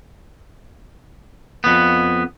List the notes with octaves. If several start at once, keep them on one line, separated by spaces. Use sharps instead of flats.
F2 B3